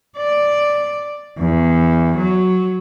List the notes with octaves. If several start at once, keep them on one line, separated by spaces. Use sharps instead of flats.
D5
E2
F#3